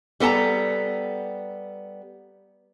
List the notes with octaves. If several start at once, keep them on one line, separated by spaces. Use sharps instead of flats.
G3 B3 A4 A5 A#5